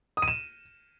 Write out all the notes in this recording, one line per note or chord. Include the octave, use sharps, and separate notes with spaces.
D#6
D#7
E7